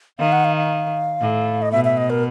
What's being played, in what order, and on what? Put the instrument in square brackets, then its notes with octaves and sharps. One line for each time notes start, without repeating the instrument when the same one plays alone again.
[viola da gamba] D#3 [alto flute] F5
[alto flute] F#5
F5
F5
[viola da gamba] A2
[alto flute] D#5
[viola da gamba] B2 [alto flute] E5
[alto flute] E5
D#5
A#4